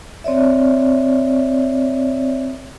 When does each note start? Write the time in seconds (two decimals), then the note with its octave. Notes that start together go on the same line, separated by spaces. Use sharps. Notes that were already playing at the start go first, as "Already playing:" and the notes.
0.24 C4 C#5 D5 E5